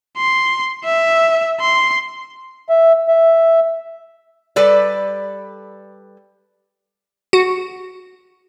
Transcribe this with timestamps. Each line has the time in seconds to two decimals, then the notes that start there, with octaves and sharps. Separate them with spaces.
0.18 C6
0.85 E5
1.60 C6
2.69 E5
3.08 E5
4.56 G3 A4 B4 D5
7.33 F#4